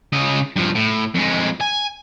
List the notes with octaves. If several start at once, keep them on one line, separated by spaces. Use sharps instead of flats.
C#3 D#5
G2 F3
A2
F2 G#3
G#5